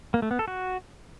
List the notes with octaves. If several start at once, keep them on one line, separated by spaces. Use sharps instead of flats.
A#3
A3
B3
A4
F#4